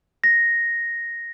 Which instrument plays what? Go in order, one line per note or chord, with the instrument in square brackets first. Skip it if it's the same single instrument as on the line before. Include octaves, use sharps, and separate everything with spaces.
[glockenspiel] A#6